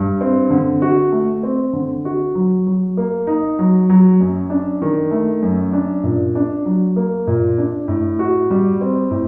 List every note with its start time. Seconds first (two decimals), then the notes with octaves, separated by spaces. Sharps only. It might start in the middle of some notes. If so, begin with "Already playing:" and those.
Already playing: G2
0.21 C4
0.50 D3
0.82 F#4
1.12 A3
1.43 C4
1.73 D3
2.05 F#4
2.35 F#3
2.67 F#3
2.97 A#3
3.27 D#4
3.59 F#3
3.90 F#3
4.20 F#2
4.50 D4
4.82 D#3
5.11 A3
5.42 F#2
5.73 D4
6.04 A#2
6.35 D4
6.65 F#3
6.96 A#3
7.27 A#2
7.58 D4
7.88 A2
8.19 F#4
8.50 G3
8.81 C4
9.11 A2